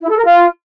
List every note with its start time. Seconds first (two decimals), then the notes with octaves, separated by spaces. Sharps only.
0.01 E4
0.09 A4
0.17 A#4
0.25 F4